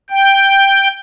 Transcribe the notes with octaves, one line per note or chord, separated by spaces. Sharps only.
G5